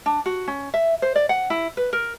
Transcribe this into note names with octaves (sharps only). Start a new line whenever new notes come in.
D4
F#4
C#4
E5
C5
D5
F#5
E4
B4
A#4